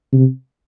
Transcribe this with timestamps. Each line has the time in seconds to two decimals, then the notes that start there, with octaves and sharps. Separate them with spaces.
0.13 C3